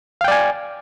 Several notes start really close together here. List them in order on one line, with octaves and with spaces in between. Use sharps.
F5 G5 D5 G#5